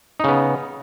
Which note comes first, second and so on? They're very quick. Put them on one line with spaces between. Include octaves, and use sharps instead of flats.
D#4 C#3 B3